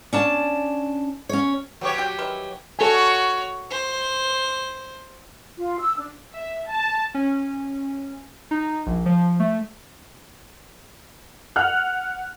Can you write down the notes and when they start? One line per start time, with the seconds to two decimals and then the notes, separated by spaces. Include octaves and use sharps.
0.13 C#4 D4 A5
1.29 C#4 C#5
1.81 E3 F#3 G4 C#5
1.98 F#4 G5
2.19 D#3 E3
2.79 F#4 A4 C#5 G#5
3.70 C5
5.57 F4
5.79 E6
5.97 D4
6.34 E5
6.69 A5
7.14 C#4
8.51 D#4
8.86 A#1
9.06 F3
9.40 A3
11.56 F#5 F6 F#6